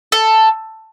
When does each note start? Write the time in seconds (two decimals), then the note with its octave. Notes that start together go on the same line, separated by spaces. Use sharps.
0.12 A4